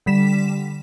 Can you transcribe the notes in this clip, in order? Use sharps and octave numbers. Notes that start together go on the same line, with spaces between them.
D3 G3 B6 E7